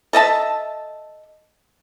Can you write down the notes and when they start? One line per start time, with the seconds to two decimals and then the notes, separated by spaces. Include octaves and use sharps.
0.13 A4 D#5 E5 A5